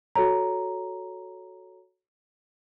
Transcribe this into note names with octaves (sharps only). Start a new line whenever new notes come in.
F#4 A4 C#5 A#5